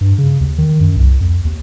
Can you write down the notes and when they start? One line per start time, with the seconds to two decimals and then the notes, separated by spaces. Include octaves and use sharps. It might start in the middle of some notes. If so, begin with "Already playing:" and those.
0.01 G2
0.18 C#3
0.41 D#2
0.58 D#3
0.80 F#2
0.97 C2
1.21 F2
1.45 D#2